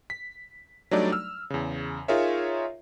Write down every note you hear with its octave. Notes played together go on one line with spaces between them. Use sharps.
B6
F#3 G3 A3 D4 D#4 D5
E6 F6
E2 C#3
D#4 F4 G#4 A#4 C#5 E5